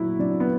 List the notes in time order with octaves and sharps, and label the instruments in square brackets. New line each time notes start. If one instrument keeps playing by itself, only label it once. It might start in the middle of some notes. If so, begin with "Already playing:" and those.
Already playing: [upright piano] A#2 F#3 E4 F#4
F#3 D4
B3